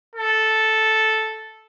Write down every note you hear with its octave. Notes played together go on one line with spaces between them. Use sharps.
A4